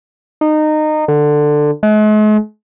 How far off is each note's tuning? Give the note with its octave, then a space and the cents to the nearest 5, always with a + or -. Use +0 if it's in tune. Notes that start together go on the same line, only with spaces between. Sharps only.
D#4 -20
D3 +15
G#3 +45